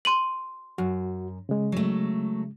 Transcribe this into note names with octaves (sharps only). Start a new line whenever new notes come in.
C6 D#7 F#7
F#2 F#4
C#3 G#3
F#3 A3